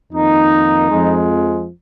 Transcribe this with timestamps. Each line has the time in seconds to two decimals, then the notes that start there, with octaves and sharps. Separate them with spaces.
0.12 F2 D#3 A#3 D#4
0.90 F2 F3 G#3